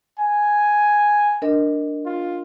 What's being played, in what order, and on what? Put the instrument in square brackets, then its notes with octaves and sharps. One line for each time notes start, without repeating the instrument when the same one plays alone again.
[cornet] G#5
[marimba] D4 A#4 D#5
[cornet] F4